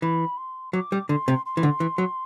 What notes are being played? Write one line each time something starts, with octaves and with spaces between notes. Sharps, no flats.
E3 B5
C6
F#3 D6
G3
D3 C6
C3
C6
E3
D3
E3
F#3